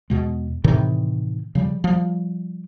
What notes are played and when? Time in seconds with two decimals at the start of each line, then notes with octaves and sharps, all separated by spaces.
0.10 E2 B2 G#3
0.64 A2 C3 D#3 E3
1.55 C#3 F3 G3
1.84 F3 G3